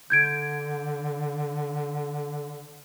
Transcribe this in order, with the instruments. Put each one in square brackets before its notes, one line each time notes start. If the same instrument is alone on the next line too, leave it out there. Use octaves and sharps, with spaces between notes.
[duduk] D3 [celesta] G6 G#6 D7